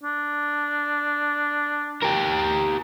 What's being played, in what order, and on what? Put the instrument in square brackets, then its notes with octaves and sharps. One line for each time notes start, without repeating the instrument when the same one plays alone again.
[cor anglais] D4
[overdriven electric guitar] G4 A#4